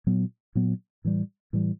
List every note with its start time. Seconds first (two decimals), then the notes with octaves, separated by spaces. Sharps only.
0.07 A#2 F#3 B3
0.55 A#2 F#3 B3
1.05 A2 E3 G3
1.53 A2 E3 G3